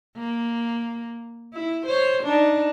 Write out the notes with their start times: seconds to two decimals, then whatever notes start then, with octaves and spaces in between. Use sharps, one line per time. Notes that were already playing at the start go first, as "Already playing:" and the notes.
0.17 A#3
1.54 E4
1.86 C5 C#5
2.23 D4 D#4